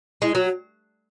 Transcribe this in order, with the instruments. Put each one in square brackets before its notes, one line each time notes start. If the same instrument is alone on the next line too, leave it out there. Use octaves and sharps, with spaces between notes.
[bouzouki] G#3 [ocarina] E4
[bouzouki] F#3 [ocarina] F#4